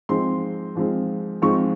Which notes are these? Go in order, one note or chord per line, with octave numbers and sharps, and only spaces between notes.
G#2 F3 G#3 C4 C6
G#2 F3 G#3 C4
G#2 F3 G#3 C4 C#6